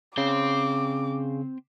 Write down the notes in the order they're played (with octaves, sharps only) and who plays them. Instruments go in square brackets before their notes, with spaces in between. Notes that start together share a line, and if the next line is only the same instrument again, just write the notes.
[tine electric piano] C#3 [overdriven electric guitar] C4 G5 [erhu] D6